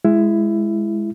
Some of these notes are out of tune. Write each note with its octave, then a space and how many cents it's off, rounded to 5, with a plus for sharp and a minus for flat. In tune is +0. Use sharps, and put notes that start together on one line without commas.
G#3 +0 E4 +15